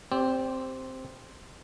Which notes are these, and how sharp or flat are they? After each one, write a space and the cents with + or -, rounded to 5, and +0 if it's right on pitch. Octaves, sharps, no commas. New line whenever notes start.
C4 +0 G4 +0 D5 -30